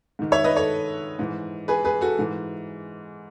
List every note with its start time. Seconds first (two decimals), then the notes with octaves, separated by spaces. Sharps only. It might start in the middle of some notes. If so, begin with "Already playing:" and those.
0.19 G#2 D#3
0.32 C#5 E5
0.44 B4 D#5
0.57 A4 C#5
1.19 G#2 E3
1.68 G#4 B4
1.85 G#4 B4
2.01 F#4 A4
2.19 G#2 E3